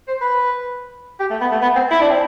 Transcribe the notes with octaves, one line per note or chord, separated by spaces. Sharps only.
C5
B4
G4
A3
B3
A3
B3
C4
E4
D4
C4